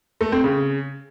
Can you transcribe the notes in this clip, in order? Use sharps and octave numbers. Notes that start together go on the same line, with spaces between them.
A3
C4
C#3